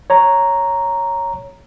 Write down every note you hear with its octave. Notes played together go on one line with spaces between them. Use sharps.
C#5 A#5